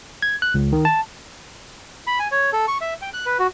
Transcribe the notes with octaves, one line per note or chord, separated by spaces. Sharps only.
G#6
F#6
C#2
D#3
A5
B5
G#5
C#5
A4
C#6
E5
G5
F#6
B4
F#4